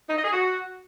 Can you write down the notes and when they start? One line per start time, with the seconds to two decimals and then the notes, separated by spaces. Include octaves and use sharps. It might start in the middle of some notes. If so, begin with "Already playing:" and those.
0.09 D#4
0.16 D#5
0.24 G#4
0.32 F#4